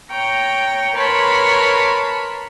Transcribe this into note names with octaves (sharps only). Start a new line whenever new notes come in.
C#5 G5 A#5
A#4 B4 C#5 A5 B5 C6